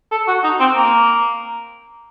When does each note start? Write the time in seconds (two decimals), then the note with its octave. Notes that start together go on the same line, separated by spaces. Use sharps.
0.12 A4
0.28 F#4
0.44 D#4
0.60 C4
0.76 A#3